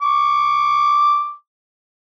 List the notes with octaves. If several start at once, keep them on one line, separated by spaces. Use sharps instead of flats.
C#6 D6